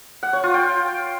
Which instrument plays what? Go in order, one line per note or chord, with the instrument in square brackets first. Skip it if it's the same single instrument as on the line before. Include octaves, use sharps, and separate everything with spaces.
[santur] F#5
C#5
F4
G5